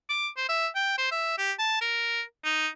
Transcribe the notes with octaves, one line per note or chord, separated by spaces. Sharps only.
D6
C5
E5
G5
C5
E5
G4
A5
A#4
D#4